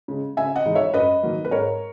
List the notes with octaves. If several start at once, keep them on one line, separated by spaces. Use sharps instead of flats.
C#3 G#3
C#3 E5 G#5
D#5 F#5
E3 G#3 D#4
C#5 E5
F#2 B4 D#5
D#3 F#3 A#3
B4
G#2 A#4 C#5